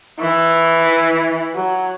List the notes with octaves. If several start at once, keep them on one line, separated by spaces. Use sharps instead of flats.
E3
F#3